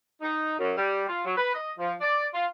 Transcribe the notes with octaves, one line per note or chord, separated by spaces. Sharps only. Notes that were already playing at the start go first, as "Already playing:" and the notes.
D#4
F#2
G3
F4
F#3
B4
D#5
F3
D5
F4